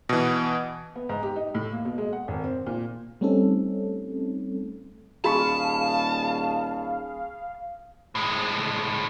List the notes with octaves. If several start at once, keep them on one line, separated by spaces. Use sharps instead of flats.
B2 E3
B3
G#2
G4
D#4
A2
A#3
B2
G#3
F#5
G#1
C4
A#2
G3 A3 C4 C#4 D#4 A4
D#1 G#4 F5 A5 B5 C#6
A2 G#3